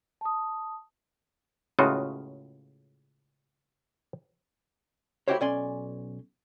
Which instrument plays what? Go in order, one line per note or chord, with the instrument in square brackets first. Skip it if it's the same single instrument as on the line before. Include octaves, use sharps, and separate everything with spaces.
[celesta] A5 D#6
[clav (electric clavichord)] C#2 A2 C#3 F4 F#4 D#5
[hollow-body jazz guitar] A3 E4 F#4 G4 C5 C#5
B1 C#4 D5 G#5 C6